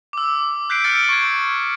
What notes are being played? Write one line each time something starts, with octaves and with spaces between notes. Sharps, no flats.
D6 E6
F#6 G6 B6 C7 D7
E6 F6 A6 C#7
C#6 G#6